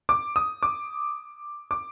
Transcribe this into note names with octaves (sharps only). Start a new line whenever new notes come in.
D6
D#6
D6
D6